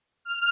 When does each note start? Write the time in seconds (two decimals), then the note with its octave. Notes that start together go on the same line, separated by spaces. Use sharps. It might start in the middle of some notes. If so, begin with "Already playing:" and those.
0.25 F6